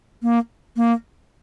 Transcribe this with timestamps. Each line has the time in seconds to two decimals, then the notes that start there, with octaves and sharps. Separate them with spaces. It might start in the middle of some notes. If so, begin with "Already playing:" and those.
0.22 A#3
0.76 A#3